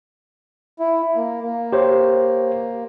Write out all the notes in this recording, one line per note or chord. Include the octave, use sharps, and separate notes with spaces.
E4
A#3
A#3
G4 C5 C#5